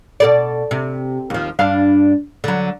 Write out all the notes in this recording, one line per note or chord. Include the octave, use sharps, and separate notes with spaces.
B2 A4 D5
C3
D#2 F3
G2 D4 F5
D3 F#3